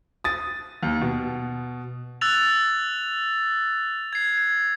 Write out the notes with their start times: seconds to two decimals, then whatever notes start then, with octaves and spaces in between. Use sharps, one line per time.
0.24 D#6 A6
0.83 D#2
1.01 B2
2.21 E6 F#6 A6 F7
4.13 G#6 C7
4.38 G#6